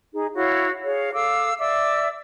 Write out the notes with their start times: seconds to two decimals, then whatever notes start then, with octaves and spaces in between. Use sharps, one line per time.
0.14 D#4 G#4
0.35 E4 F#4 C#5 F5
0.84 G#4 C#5 F5
1.13 A4 F5 D6 E6
1.59 D5 E5 D6 E6